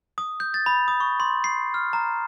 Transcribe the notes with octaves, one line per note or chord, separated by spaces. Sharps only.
D#6
G6
A6
B5
D#6
C#6
C6
C7
F6
A#5